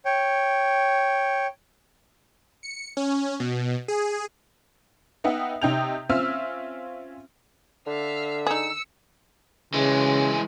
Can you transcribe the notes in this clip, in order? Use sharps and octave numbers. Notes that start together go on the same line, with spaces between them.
C#5 G5
C#7
C#4
B2
G#4
B3 D#4 E5 F#5 G5
C3 D#4 G5 G6 F7
C4 C#4 F4 E5 E6 F6
D3 E5 F5
D#4 G#4 E6 C#7
C#3 E3 G#3